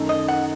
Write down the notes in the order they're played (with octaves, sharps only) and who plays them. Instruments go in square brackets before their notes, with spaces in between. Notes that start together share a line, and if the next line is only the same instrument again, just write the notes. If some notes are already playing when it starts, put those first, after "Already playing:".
Already playing: [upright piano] F#2 D#3 A3 D#4 A4
[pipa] D#5
F#5